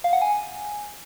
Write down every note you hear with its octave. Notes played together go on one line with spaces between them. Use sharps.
F5
F#5
G#5